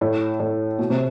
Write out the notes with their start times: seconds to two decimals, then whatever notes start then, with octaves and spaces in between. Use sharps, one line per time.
0.01 A2
0.40 A2
0.79 B2
0.90 C3